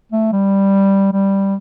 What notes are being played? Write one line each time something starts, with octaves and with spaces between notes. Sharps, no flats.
A3
G3
G3